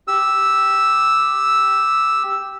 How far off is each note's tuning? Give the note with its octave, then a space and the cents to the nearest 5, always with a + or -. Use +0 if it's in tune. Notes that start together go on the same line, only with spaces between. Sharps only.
G4 +0 E6 +0